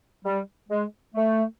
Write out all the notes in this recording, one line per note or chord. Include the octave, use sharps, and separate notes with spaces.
G3
G#3
A3